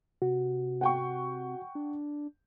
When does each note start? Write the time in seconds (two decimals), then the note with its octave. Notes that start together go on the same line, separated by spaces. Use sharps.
0.22 C3 F#4
0.81 F#5 G5 C#6
1.75 D4